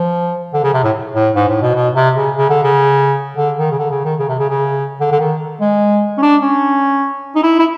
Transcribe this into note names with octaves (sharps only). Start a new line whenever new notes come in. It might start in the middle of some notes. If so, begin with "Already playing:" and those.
Already playing: F3
D3
C#3
C3
A2
A2
G#2
A2
B2
B2
C3
C#3
C#3
D3
C#3
D3
D#3
C#3
D3
C#3
D#3
C#3
C3
C#3
C#3
D3
D3
D#3
G#3
C#4
D4
C#4
D#4
E4
E4